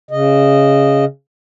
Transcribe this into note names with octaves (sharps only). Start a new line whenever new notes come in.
C#3 D#5